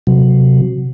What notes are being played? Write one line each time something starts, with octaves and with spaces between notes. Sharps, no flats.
C3 F#3